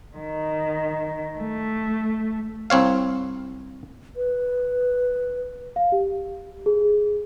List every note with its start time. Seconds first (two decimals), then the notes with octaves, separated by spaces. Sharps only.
0.17 D#3
1.38 A3
2.70 C2 C4 C#5 F5
4.16 B4
5.76 F5
5.92 G4
6.66 G#4